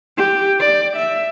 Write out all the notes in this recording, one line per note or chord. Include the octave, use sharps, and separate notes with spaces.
G4
D5
E5